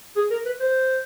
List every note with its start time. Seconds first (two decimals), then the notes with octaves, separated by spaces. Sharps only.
0.16 G#4
0.31 A#4
0.46 B4
0.60 C5